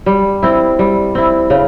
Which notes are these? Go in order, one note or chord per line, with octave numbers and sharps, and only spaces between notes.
G3
C4 E4
G3
C4 E4
C#3